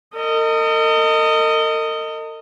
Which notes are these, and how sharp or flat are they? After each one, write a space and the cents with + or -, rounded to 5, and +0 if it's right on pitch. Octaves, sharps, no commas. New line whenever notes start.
A#4 -45 D#5 +0